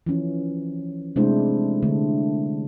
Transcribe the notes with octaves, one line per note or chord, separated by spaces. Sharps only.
E3 F3 C#4
C3 G#3 A3 D4 E4 C5
D3 A3